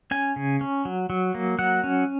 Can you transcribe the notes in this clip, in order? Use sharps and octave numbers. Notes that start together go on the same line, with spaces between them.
C#4 G#5
C#3
C#4
F#3
F#3
A#3
F#3 F#5
C#4